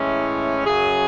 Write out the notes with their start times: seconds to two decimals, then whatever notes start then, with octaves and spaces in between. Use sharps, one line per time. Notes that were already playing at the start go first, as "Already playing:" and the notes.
Already playing: A2 E3 G#3 C#4
0.66 F#2 C#3 F#3 G#4